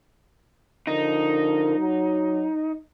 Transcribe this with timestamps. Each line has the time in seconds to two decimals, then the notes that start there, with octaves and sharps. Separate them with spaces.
0.87 D3 F3 D#4 A#4
1.78 F#3